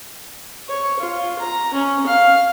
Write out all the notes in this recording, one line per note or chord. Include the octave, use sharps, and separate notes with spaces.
C#5
F4
A#5
C#4
F5